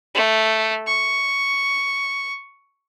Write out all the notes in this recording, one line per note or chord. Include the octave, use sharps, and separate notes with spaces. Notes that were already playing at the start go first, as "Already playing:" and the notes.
A3
C#6